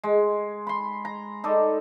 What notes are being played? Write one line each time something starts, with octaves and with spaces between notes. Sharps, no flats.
G#3
B5 C6
A#5
D#4 A4 D5